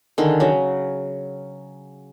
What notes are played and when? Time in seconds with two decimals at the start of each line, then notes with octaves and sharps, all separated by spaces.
0.18 D3 D#3 G#4
0.40 C#3 F#3